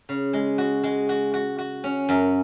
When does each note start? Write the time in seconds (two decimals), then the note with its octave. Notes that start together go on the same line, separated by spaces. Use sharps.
0.09 C#3
0.33 G#3
0.58 F#4
0.84 G#3
1.09 F#4
1.34 F#4
1.58 F#4
1.84 C#4
2.09 F#2